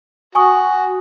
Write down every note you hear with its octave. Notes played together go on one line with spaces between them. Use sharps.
F#4 G#5 C#6 D#6